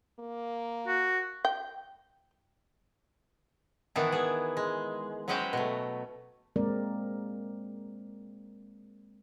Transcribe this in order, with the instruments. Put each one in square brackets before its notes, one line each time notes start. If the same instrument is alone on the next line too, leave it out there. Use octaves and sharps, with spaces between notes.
[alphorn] A#3
[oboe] F#4
[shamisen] G5
[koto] D#3 E3 B3 D4 E4
B3 G#4
G#3
F#3 G#3 C#4 B4 C5 G5
B2 A3
[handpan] G#3 A#3 C4 A#4 D5